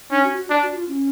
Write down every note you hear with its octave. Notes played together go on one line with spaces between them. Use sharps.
C#4 D4
F#4
F#4
D4
F#4
F4
C#4